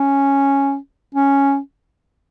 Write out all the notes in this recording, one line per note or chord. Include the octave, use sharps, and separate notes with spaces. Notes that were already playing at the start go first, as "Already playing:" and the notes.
Already playing: C#4
C#4